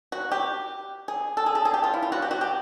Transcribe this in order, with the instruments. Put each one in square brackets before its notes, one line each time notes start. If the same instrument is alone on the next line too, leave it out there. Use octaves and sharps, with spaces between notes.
[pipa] F#4
G4
G#4
A4
G#4
A4
G#4
G4
F4
E4
F4
F#4
G4
F#4
G4